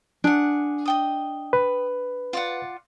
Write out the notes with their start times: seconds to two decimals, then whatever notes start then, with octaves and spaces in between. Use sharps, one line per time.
0.24 D4 G#4 F#5
0.86 D#5 G5 D#6
1.53 B4
2.33 F4 D5 F#5